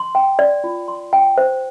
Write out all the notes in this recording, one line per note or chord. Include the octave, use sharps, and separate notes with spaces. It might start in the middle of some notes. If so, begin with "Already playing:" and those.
Already playing: C6
G5
D5
F4
C6
G5
C5